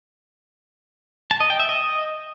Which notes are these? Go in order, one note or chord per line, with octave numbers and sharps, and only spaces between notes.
A5
D#5
G5
E5
D#5